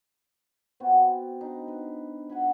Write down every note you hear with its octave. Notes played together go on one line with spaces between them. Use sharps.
B3 C4 F#4
D4 D#4
B4
F#5 G#5 B5